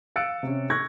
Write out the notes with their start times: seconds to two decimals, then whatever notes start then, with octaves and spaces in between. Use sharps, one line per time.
0.16 F5 E6 F#6 A6 C#7 D7
0.43 C3 C#4
0.70 C#6 E6 F#6 G#6 A#6